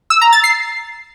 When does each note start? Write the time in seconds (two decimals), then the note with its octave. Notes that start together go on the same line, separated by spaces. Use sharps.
0.10 E6
0.21 A#5
0.33 A6
0.44 C7